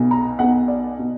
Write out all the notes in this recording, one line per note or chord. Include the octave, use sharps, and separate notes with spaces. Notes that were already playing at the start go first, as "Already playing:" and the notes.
Already playing: B1 B2
A#5
B1 B2 F#5
D5
B2